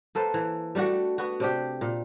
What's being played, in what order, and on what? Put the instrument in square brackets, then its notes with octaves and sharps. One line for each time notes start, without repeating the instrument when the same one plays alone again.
[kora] A#3 A4 B4 C5
E3
G3 A3 D4 F#4
B3 F#4
C3 D4 G4
A#2